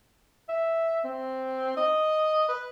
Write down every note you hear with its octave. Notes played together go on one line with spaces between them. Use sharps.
E5
C4
D#5
B4